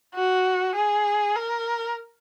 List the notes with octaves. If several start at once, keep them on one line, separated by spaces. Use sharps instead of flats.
F#4
G#4
A#4